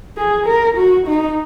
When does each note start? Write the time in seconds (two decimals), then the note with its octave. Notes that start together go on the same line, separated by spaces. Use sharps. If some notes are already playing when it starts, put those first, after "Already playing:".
0.17 G#4
0.46 A#4
0.77 F#4
1.07 D#4